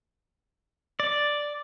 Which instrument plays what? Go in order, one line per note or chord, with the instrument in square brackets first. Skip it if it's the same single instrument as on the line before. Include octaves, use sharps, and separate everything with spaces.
[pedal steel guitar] D5